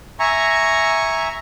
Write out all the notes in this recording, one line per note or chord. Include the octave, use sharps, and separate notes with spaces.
E5 G#5 A#5 C#6